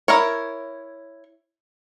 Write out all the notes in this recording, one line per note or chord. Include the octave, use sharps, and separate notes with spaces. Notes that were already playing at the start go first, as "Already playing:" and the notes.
E4 A#4 C#5